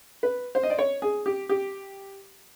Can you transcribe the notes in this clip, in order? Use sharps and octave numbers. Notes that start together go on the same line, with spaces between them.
B4
C5
D#5
D5
C#5
G#4
G4
G4